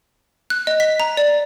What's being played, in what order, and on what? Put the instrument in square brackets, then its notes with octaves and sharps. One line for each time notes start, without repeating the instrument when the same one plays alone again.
[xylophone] F#6
D#5
B6
A#5
D5